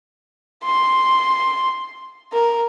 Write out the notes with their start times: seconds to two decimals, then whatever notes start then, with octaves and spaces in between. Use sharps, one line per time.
0.64 C6
2.33 A#4